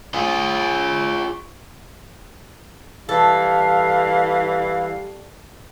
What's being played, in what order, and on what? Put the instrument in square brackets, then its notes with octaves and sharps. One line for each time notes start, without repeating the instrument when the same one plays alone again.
[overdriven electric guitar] F4 G#4
[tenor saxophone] E3 [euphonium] G3 [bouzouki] A4 [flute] F5